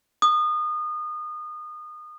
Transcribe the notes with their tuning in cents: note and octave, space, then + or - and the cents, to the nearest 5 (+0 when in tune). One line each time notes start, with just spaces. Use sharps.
D#6 -30